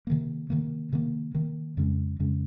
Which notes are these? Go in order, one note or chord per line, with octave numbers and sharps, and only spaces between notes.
C3 D#3 A#3
C3 D#3 A#3
C3 D#3 A#3
C3 D#3 A#3
F2 C#3 G#3 C#4
F2 C#3 G#3 C#4